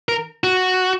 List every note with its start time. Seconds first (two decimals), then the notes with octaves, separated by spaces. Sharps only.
0.09 A#4
0.44 F#4